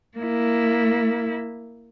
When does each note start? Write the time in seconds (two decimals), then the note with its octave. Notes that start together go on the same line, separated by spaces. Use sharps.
0.18 A#3 E4